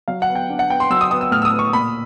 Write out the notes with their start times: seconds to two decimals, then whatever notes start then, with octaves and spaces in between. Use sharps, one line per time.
0.08 F#3 F5
0.22 F#5
0.29 B3
0.35 G5
0.50 D4
0.59 F#5
0.70 B3 G5
0.80 C6
0.90 F#3 E6
1.01 D#6
1.11 B3 D#6
1.21 E6
1.31 A2 F6
1.42 E6
1.45 D#6
1.53 B3
1.59 C#6
1.73 A#2 B5